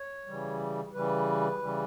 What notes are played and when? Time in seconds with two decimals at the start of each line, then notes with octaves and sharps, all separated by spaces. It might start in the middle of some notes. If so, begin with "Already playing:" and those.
Already playing: C#5
0.26 C#3 E3 G3
0.94 C#3 E3 G3 B4
1.62 C#3 E3 G3